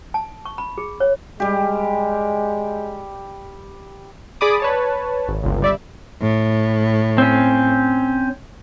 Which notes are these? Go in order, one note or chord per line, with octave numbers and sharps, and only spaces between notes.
A5
C#6
B5
G#4
C#5
G3 G#3 G4
G#4 D5 B5 D6 D#6
B4 C#5 A5
G#1
G1 C#2
G3 D5 E5
A2
C4 C#4